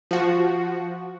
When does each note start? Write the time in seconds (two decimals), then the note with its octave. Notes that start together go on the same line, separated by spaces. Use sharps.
0.11 F3 F#4